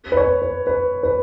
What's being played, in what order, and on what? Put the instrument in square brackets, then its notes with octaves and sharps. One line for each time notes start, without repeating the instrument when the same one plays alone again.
[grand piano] B4
C#5
B4
B4
B4